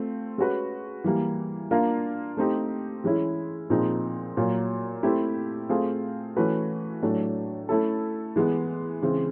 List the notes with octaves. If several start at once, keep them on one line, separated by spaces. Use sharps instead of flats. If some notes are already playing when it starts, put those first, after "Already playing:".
Already playing: A3 C4 F4
G#3 C#4 F#4 B4
E3 G3 A#3
A#3 D4 F4 A#4
A3 C4 D#4 G4
E3 G#3 C#4 E4
A#2 F3 G#3 C4 D#4
A#2 F#3 A#3
A3 C4 E4 G4
A3 C4 F4 G#4
E3 A3 C#4 F#4 B4
A2 F#3 A3 D4
A3 C#4 E4 A4
E3 G#3 B3
C#3 E3 G#3 C4